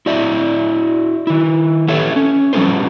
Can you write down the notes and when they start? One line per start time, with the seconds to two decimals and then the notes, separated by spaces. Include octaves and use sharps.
0.06 E4 F#4 D5 E5
1.27 D#3 E4
1.88 G4 A4 B4 C#5 E5
2.16 C#4
2.53 F3 G3 C#4 A4 B4 C5